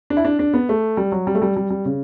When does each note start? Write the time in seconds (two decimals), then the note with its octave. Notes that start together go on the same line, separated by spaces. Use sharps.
0.10 D4
0.17 E4
0.25 D4
0.39 D4
0.54 B3
0.69 A3
0.97 G3
1.12 F#3
1.27 G3
1.35 A3
1.42 G3
1.56 G3
1.70 G3
1.85 C#3